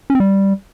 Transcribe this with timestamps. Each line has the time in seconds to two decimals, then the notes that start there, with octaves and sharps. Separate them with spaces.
0.10 C#4
0.15 C4
0.20 G3